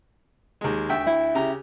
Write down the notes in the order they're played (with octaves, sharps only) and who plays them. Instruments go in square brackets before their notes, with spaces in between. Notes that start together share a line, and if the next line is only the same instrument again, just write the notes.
[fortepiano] D#2 G#3
D2 E5 G5
[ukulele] E4
[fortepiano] C#3 G4 A#5